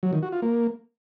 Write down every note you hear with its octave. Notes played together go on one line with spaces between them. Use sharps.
F#3
D#3
F#4
F4
A#3